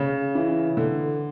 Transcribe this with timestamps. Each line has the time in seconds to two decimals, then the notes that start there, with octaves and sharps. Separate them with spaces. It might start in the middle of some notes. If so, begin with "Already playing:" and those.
Already playing: C#3
0.35 E3
0.77 D3